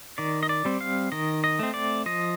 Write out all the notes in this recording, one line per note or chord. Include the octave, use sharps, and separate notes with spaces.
D#3 D5
D#5
D5
G3 C4
F5
D#3 D#5
D#5
A3 C4
D5
F3 D#5